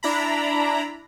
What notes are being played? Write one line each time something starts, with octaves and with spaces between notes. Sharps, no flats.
D4 E4 A#5 B5